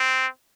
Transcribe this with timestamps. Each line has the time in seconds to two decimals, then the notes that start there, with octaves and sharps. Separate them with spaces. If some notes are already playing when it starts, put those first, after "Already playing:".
Already playing: C4